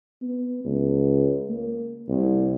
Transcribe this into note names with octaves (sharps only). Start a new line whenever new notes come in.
B3
C#2
A#3
C2